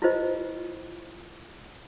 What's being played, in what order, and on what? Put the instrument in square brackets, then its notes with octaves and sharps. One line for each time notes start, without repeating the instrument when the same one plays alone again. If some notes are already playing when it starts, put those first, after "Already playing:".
[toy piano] E4 F4 G4 B4 C5 D#5